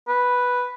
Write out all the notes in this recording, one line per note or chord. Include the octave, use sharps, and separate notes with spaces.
B4